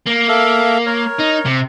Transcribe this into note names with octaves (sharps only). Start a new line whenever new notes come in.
A#3
A4 E5 F5
A#4 C#5
D#4
C3